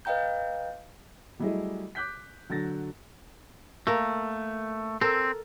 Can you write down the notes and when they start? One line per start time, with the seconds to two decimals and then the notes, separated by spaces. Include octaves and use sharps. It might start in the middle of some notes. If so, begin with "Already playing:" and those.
0.05 B4 D#5 F5 G5 A#5 G6
1.39 F#3 G3 A3 E4 G#4 D#5
1.95 D6 F#6 G6 B6
2.49 D3 F#3 A4 A6 A#6
3.87 A3 A#3 A#4
5.01 C4 A4 A#4